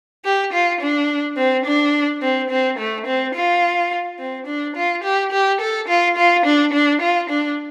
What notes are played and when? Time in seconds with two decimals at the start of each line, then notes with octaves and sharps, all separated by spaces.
0.24 G4
0.53 F4
0.81 D4
1.37 C4
1.65 D4
2.22 C4
2.50 C4
2.78 A3
3.06 C4
3.34 F4
4.19 C4
4.47 D4
4.76 F4
5.04 G4
5.32 G4
5.60 A4
5.88 F4
6.17 F4
6.45 D4
6.73 D4
7.01 F4
7.29 D4